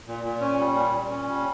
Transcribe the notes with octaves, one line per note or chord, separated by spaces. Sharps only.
A#2
A#2
C#4
G3
A#2
A#2
C#4
G3